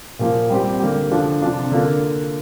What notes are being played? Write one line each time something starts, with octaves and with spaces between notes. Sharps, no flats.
A#2 F3 A#3
G3 C4 G4
D3 A#3 G4
D3 F3 D4 F4
C3 F3 D4 F4
D3 A#3 F4